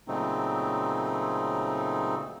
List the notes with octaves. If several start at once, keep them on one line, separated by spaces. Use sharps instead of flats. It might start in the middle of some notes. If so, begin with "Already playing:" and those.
A#2 C#3 F#3 A3 C4 D#4